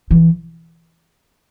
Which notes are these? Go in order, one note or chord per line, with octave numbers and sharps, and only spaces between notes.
E3